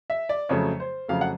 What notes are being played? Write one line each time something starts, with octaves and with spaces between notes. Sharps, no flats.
E5
D5
F2 C#3 F#3 A3 C#5
C5
F2 C#3 F#3 A3 F5
F#5